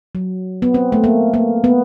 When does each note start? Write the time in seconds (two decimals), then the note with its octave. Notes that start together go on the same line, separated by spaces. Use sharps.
0.15 F#3
0.62 B3
0.74 C4
0.92 A3
1.04 A#3
1.34 A#3
1.64 B3